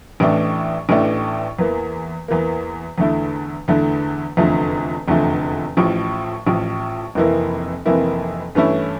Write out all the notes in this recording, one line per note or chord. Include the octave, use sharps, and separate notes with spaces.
A1 A2 E3 A3 D4
A1 A2 E3 A3 D4
E2 E3 A#3
E2 E3 A#3
E2 D3 A3 E4
E2 D3 A3 E4
F1 E2 D3 F3 A3
F1 E2 D3 F3 A3
A1 A2 F3
A1 A2 F3
F1 F2 E3 A#3 E4
F1 F2 E3 A#3 E4
G2 E3 A3 C#4 E4